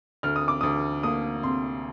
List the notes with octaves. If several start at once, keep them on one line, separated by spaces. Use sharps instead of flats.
D2 F6
D#6
D6
D2 D#6
A#3 D#6
C3 C6